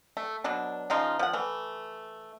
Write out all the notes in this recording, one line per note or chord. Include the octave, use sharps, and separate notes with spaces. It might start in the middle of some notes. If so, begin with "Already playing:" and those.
A3
B2 F#3 D4
C#3 F3 D#4 F4
F3 F#5
E3 A3